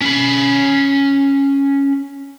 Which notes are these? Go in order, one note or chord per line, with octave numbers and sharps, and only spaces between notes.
C#4 B5